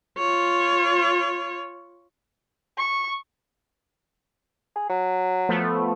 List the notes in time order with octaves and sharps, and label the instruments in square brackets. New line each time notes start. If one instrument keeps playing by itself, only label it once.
[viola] F4 C#5
[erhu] C#6
[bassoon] G#4
F#3
[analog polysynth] F3 A3 B3